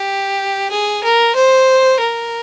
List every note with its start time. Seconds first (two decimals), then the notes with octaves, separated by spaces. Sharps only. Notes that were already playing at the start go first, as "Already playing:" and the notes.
Already playing: G4
0.71 G#4
1.04 A#4
1.35 C5
2.00 A#4